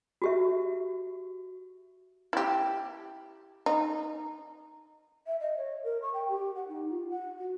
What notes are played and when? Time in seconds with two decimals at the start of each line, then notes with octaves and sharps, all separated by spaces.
0.22 F#4 G4 E5
2.33 E4 G4
3.66 D#4
5.26 E5
5.40 D#5
5.57 C#5
5.83 A#4
6.02 C#6
6.14 G5
6.28 G4
6.55 F#5
6.68 D#4
6.90 F4
7.09 F#5
7.38 F#4